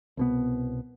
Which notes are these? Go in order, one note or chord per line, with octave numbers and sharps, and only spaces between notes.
C2 B2 B3